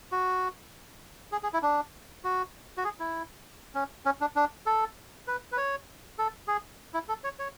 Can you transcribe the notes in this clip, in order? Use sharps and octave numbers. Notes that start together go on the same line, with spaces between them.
F#4
G#4
G#4
E4
D4
F#4
F#4
G#4
E4
C#4
C#4
D4
D4
A4
B4
B4
C#5
A4
G#4
E4
A4
C#5
C#5